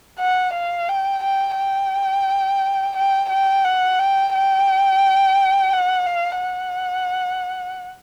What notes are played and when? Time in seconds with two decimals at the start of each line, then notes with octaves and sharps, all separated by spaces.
0.20 F#5
0.54 F5
0.89 G5
1.24 G5
1.57 G5
2.96 G5
3.30 G5
3.65 F#5
3.99 G5
4.34 G5
5.73 F#5
6.07 F5
6.41 F#5